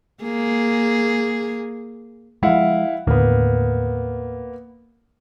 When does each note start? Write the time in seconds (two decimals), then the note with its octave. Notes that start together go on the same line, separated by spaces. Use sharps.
0.23 A#3 G#4
2.43 F3 G#3 E4 F5 F#5
3.07 D#2 A2 D3 A#3 B3